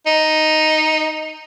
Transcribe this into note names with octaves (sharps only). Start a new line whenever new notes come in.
D#4